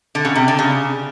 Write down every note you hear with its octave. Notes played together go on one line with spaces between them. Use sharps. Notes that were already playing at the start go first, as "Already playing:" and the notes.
D3
C#3
C3
D3
C#3